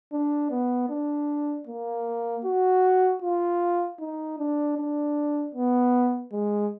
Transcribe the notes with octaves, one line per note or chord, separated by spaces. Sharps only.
D4
B3
D4
A#3
F#4
F4
D#4
D4
D4
B3
G#3